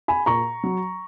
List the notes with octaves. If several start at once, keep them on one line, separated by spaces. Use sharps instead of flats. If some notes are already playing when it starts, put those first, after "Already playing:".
G#5 B5
A#2 A#5 C#6
F#3